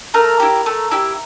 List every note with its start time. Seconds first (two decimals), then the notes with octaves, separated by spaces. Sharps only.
0.14 A3 A#4
0.40 E4 G4
0.66 A3
0.91 E4 G4